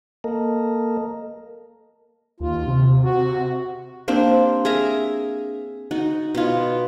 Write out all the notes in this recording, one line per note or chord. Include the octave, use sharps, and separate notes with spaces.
A#3 A4 A#4 D#5
D#2 F4
C3
F#4
A#3 C4 D4 G4
G#4 A#4 E5 A#5
D#4 F#4
B2 F4